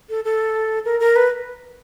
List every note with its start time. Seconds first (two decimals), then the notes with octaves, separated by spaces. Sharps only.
0.10 A4
0.24 A4
0.85 A#4
1.00 A#4
1.16 B4